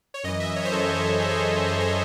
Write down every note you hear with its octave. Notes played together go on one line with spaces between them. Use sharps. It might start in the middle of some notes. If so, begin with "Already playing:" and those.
C#5
F#2 E3 D#5
E5
C#5
C5
F#2 E3 A4
A4
F#2 E3 G#4
A4
G#4
F#2 E3 A4
C5